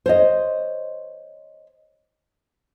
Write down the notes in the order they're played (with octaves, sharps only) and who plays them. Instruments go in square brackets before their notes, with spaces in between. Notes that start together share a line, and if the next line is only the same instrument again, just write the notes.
[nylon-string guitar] C5 C#5 D#5